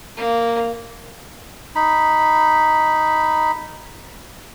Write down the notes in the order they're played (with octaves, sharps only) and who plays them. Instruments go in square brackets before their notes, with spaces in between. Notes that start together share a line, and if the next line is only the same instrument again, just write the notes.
[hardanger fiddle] A#3
[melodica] D#4 B5